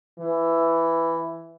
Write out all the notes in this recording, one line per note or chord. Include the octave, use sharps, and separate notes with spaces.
E3